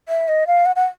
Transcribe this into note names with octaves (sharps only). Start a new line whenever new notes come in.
E5
D#5
F5
F#5
F#5